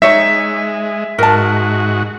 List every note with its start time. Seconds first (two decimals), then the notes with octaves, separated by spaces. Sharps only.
0.02 G#3 D#4 C#5 E5
1.19 G#2 F#4 A#4 A5